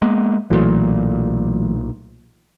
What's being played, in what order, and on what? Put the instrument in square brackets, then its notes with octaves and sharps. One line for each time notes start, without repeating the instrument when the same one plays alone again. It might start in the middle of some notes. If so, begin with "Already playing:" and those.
[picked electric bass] G#3 A#3 B3
[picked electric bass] B1 A#2 [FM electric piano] E3 F#3 A3